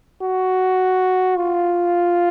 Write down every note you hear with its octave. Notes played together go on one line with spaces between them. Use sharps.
F#4
F4